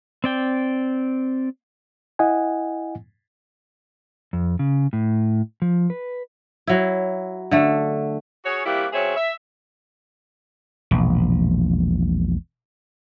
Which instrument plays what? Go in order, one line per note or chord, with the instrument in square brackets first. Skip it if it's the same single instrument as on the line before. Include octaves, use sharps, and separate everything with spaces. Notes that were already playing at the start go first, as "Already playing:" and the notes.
[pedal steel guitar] C4 D5 G5
[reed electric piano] E4 D#5 F#5 G#5
[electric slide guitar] F2
C#3
A2
F3
B4
[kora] F#3 E4
D3 A3
[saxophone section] C#4 F#4 G#4 C#5
C3 G3 A#3 E4 F#4 G4
C#3 F#3 C4 G#4 C#5 E5
E5
[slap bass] E1 A#1